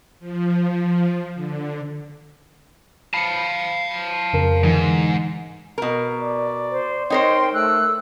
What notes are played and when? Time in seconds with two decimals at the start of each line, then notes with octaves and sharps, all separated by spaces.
0.20 F3
1.34 D3
3.14 F5 A5 B5 C#7
4.33 F2 C#3 A#4
4.63 G#2 D3 E3
5.78 B2 A#4
6.22 D5
6.71 C5
7.10 D#4 A#4 C5 C#5 G5 C6
7.54 A3 E6 F#6